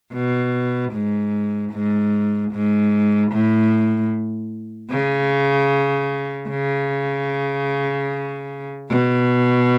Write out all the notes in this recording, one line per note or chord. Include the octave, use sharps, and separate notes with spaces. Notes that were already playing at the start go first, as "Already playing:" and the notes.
B2
G#2
G#2
G#2
A2
C#3
C#3
B2